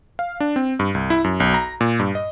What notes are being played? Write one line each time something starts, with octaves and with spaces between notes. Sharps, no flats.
F5
D4
C4
G2
C2
E4
F#2
B1
A#5
A#2
G2
D#5